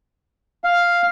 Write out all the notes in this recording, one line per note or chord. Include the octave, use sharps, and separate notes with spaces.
F5